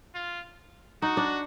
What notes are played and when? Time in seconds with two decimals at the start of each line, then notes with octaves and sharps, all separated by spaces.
0.14 F4
1.02 D#4 F#4
1.17 D4